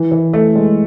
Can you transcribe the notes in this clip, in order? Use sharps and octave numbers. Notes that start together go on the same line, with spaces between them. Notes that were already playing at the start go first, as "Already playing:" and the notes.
Already playing: E3
E3
A3
G#3